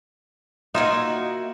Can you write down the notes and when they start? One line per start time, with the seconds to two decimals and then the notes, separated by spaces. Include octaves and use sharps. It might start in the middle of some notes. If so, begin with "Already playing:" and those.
0.75 A#3 D#4 F4 F#4 E5